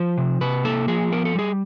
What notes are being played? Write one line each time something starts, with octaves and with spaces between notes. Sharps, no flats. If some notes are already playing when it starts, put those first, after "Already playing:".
Already playing: F3 C5
C3
C3 B4
A#3 A4
F3 G#4
B3 A#4
A4
G3 G#4